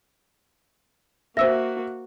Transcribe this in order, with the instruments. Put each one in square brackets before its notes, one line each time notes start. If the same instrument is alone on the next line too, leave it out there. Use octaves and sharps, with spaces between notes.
[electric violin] A#3 F#4 [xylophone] C5 E6 A#6 [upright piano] E5